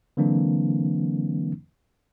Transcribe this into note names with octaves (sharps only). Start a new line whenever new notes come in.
D3 E3 F#3 A#3 C4 D4